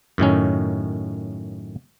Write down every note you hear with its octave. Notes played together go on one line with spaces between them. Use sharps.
F#2 A2 D#3 C#4